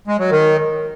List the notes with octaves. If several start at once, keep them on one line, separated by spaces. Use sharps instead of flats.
G#3
F#3
D#3